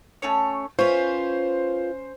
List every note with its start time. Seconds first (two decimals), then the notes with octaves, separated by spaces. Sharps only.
0.22 A3 C#4 C#5
0.79 C#4 F4 B4 C5